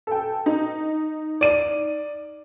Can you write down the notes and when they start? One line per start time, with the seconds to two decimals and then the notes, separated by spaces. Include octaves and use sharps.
0.07 A4 G5
0.46 D#4
1.41 D5 D#7